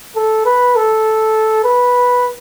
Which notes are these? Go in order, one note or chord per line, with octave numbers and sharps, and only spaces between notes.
A4
B4
A4
B4